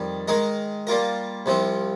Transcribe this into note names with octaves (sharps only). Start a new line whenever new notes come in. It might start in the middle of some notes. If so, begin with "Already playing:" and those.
Already playing: F2 D#3 G3
D#3 G#3 D#4 A#4
G3 A#3 F4 A#4
C2 C3 F3 C4